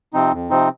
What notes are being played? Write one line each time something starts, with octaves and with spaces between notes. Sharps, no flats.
C3 F3 C4 D#4
F2
C3 F3 C4 D#4